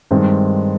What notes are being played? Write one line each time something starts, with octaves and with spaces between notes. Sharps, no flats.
G2 D#3 G#3 C4